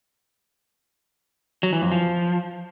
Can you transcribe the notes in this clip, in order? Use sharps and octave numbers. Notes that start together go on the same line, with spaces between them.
F#3
E3
F2
F3